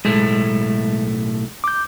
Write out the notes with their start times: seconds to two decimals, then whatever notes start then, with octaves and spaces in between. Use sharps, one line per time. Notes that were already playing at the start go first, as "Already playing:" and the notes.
0.05 B1 A2 G#3 A3
1.64 D6 G6